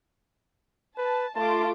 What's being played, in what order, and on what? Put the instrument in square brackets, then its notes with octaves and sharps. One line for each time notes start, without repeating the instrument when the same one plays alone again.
[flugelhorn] B4 [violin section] A5
[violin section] A3 F4 D6 [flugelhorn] A5